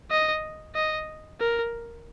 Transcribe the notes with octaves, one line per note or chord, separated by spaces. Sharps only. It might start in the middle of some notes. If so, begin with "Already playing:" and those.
D#5
D#5
A#4